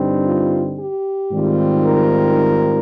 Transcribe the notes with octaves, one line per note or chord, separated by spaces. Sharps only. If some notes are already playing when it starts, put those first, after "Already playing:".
Already playing: G2 D3 G3 C4 D#4
F4
G4
G#2 D#3 G3 C4 F4
A#4